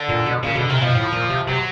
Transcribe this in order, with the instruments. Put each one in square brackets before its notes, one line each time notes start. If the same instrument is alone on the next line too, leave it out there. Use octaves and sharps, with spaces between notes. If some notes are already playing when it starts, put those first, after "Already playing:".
Already playing: [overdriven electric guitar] D3
[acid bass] A#2
B2
[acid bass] A#2 [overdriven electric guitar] C#3
[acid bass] B2 [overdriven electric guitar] D3
[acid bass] C3 [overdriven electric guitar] D#3
[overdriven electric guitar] E3
[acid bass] B2 [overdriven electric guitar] F3
[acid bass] A2
A#2
C3
[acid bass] C3 [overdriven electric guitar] F#3